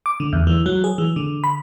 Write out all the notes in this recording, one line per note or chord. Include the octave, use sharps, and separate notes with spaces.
D6
D3
E2
E3
F#3
G#4
E3
D3
B5